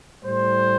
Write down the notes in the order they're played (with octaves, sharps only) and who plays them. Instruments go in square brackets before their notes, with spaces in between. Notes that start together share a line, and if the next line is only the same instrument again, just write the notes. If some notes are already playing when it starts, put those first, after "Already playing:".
[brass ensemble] A2 G3 C5